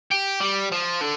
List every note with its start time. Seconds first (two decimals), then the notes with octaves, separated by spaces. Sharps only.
0.12 G4
0.41 G3
0.72 F3
1.01 D3